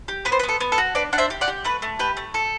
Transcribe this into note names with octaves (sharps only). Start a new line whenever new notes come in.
G4
B3 B4
C5
B4
B3
A4
B3
A4
F#4
D4 B4 D5
D4 F#5
C5 E5
G4
D5 F#5
G4
A3 B4
A3
G4 B4
A3
A4